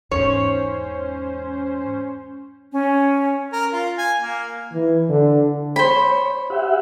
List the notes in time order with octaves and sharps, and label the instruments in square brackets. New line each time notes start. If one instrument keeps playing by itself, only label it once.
[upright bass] E2 G#2 [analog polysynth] C#4 C5 [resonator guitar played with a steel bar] C#5
[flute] C#4
[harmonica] A#4
F4
G#5
A#3
[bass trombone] E3
D3
[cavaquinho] C5 B5 [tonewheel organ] C#5
[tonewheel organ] G4 E5 F#5